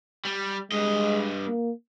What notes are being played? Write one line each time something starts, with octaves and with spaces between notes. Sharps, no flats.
G3
G2 G#3 D#5
A#3